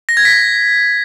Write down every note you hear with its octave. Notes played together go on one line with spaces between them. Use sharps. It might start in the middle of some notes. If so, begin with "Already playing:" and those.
A#6
G#6
B6